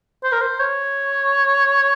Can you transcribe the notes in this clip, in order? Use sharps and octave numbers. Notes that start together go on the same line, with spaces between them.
C5
A#4
C5
C#5